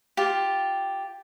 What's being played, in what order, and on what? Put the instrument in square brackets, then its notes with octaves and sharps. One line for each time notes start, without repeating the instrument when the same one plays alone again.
[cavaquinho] F4 G4